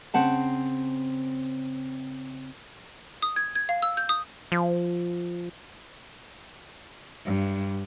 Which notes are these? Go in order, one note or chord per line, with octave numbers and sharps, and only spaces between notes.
C#3 C4 F#5 A5
D#6
G#6
G#6
F5
E6
G6
D#6
F3
G2